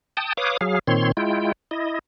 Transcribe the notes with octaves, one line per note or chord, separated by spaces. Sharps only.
G5 A5 D#6
B4 C#5 F5 D6 D#6
F#3 G#4 F5
A#2 D#3 C4 C#5 C6
G#3 E4 F4 G5
E4 D#5